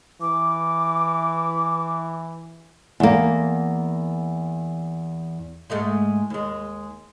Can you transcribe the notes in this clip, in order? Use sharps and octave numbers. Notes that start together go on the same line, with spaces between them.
E3 D6
E2 A#3
G#2 G#3 A3
D#2 G#3